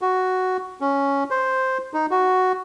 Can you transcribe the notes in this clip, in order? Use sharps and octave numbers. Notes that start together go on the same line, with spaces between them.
F#4
C#4
C5
D#4
F#4